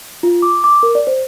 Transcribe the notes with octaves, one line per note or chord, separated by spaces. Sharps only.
F4
D6
D6
A#4
D5
C5